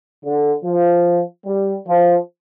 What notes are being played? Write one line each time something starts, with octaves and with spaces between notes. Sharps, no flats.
D3
F3
G3
F3